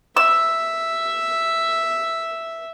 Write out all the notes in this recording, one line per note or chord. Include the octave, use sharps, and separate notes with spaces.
E5 E6